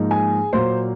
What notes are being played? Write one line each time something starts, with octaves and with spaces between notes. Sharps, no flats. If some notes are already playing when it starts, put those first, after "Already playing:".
Already playing: G#2 F3 A#3 D#4
G#4 G#5
A#2 F#3 A#3 C5 C6